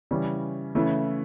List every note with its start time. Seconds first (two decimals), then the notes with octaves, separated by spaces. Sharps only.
0.11 C#3 E3 G3 C#4
0.75 C#3 E3 A3 E4